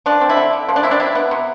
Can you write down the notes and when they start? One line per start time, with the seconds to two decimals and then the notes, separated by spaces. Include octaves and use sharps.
0.06 F3 D4
0.21 C4
0.29 E4
0.37 D3
0.53 D3
0.69 F3
0.76 D4
0.83 C4 E4
0.91 D4
1.00 G3 E4
1.15 B3
1.31 C3